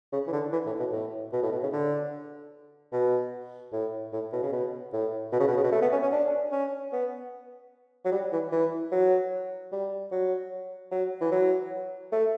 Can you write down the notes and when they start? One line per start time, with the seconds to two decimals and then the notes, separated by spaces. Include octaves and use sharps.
0.13 C#3
0.27 E3
0.33 D3
0.53 E3
0.66 A2
0.80 B2
0.93 A2
1.33 B2
1.43 A2
1.52 B2
1.63 C#3
1.73 D3
2.92 B2
3.73 A2
4.13 A2
4.32 B2
4.42 C#3
4.52 B2
4.93 A2
5.33 B2
5.40 C#3
5.48 B2
5.56 C#3
5.64 B2
5.72 A3
5.82 B3
5.92 C#4
6.03 C#4
6.12 D4
6.52 C#4
6.92 B3
8.05 F#3
8.12 G3
8.32 E3
8.52 E3
8.92 F#3
9.72 G3
10.12 F#3
10.92 F#3
11.21 E3
11.32 F#3
12.12 A3